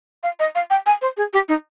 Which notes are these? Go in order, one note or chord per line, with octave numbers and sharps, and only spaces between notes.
F5
D#5
F5
G5
G#5
C5
G#4
G4
D#4